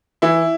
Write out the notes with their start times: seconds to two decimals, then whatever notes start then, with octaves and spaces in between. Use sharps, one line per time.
0.22 E3 E4